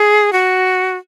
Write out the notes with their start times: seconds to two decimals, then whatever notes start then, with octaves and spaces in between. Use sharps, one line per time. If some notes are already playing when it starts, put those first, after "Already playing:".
Already playing: G#4
0.33 F#4